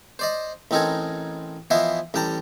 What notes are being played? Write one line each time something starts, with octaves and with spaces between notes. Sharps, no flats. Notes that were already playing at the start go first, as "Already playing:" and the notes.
C5 D5 D#5
A1 C4 D#4 A4 A#4 G#5
E3 F3 B3 E4 C5 D#5
A1 G3 G5 A5 A#5